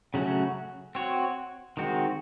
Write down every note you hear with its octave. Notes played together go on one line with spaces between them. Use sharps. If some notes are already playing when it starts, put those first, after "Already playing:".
C#3 F#3 A3 C#4 F#4
C4 F#4 C#5
D#3 G#3 C4 F#4